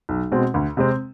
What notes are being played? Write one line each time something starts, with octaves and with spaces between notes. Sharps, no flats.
B1
B2 G#3 C4
D2
C3 G#3 C4